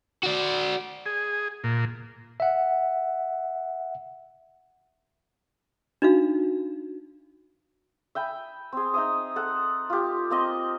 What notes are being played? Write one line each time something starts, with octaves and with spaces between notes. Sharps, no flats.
F#4 D5
G#4
A#2
E5 F#5
D4 D#4 F#4 F5
E5 G5 G#5 B5
C4 G#4
D#4 E5 D#6
A4 F#5
F4 G4
A#3 C4 D#5